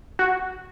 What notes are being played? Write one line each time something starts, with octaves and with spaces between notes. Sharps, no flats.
F#4